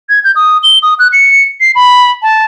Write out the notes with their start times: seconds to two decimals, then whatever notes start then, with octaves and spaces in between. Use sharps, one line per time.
0.09 G#6
0.24 G6
0.36 D#6
0.63 G7
0.83 D#6
0.99 F#6
1.13 C#7
1.60 C7
1.75 B5
2.22 A5